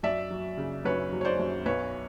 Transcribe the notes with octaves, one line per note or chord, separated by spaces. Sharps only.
F#2 D5 E5
F#3
C#3
F#2 B4 C#5
F#3
C#5
C5 D5
F#2
B1 B4 C#5